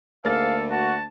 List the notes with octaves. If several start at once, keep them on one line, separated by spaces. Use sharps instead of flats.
D2 G#2 A#3 A4 F5 A6
F#4 A5